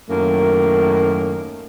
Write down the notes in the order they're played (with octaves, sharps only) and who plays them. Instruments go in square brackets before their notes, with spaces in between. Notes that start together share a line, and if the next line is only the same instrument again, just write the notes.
[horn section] F#2 A2 D#3 A#3